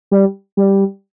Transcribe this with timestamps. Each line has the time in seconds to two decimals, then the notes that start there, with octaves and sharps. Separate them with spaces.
0.11 G3
0.57 G3